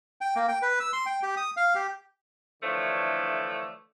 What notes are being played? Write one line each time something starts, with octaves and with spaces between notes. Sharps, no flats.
G5
A#3
G5
B4
E6
C6
G5
G4
D#6
F5
G4
D3 E3 F3 A3 D4 C#5